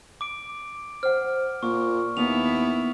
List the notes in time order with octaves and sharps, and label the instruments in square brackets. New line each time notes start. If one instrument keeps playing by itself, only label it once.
[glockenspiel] D6 D7
[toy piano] C5 F#5 [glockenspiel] F6
[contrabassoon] A#2 [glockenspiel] C#6
[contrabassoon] D#2 [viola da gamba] B3 E4 [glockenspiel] F7